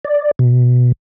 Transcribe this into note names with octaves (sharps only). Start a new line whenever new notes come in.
D5
B2